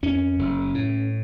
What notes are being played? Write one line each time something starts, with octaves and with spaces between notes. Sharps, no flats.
F2 C#4
F#1
A2